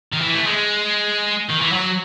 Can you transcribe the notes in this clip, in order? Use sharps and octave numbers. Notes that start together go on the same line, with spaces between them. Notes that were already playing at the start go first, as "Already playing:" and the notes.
D#3
E3
A3
G#3
D#3
E3
F#3